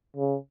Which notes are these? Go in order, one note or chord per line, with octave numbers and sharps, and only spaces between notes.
C#3